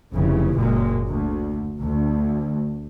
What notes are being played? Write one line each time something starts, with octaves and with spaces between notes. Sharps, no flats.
F1 C#3 E3
F#1 A#2 G#3
D2
D2